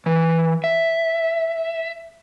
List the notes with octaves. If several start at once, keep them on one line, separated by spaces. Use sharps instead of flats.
E3
E5